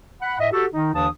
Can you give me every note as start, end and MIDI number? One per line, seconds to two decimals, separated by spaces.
0.22 0.38 78
0.22 0.38 83
0.39 0.48 45
0.39 0.48 75
0.39 0.48 76
0.52 0.66 66
0.52 0.66 67
0.52 0.66 69
0.74 0.93 51
0.74 0.93 63
0.94 1.08 39
0.94 1.08 50
0.94 1.08 52
0.94 1.08 62
0.94 1.08 81
0.94 1.08 87